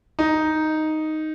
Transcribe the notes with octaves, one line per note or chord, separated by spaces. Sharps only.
D#4